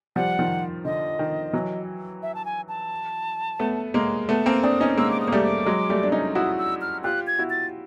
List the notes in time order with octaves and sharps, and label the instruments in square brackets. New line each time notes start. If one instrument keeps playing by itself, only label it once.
[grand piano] F3 G3 [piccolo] F#5
[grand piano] D#3 F3
[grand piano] D3 [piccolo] D#5
[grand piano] D#3
E3 F#3
[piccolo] E5
A5
G#5
A5
[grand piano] A3 B3
G#3 A#3
[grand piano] A3 B3 [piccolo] A5
[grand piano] A#3 C4
[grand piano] C4 D4 [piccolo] D#6
[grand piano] C#4 D#4
[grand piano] G#3 A#3 [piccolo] E6
[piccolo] D6
D#6
[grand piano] A#3
G3 A3
[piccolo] D6
[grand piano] F#3 G#3
G3 A3
D4
C#4 D#4
[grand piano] E4 F#4 [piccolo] D#6
[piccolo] E6
F6
[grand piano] F4 G4 [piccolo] F#6
[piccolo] G#6
[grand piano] E4 F#4
[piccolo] A6